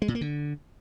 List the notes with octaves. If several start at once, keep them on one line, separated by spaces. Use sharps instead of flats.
G#3
A#2
A#3
D3